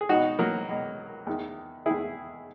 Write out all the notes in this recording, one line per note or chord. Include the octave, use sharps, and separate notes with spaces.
G#4
C#2 B2 D#4 F#4
F#3 A#3
C#2 B2
E2 D#3
E2 D#3 E4 G#4